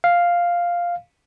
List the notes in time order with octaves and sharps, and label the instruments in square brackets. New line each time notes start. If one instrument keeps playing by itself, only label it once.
[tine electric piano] F5